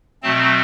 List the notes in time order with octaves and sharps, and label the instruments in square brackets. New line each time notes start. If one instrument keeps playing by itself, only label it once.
[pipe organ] B2 F#3 A3 C4 A5